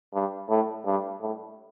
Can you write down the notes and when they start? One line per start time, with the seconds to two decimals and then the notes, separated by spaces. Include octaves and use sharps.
0.14 G2
0.49 A2
0.85 G2
1.21 A2